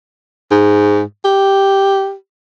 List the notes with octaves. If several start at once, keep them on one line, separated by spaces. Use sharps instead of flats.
G#2
G4